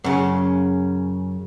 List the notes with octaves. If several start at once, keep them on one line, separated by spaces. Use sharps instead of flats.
F#2 C#3